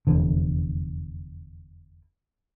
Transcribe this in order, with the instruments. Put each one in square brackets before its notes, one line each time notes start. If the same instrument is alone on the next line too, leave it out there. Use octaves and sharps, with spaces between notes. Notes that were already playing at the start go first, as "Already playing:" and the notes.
[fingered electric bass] F1 E2 D3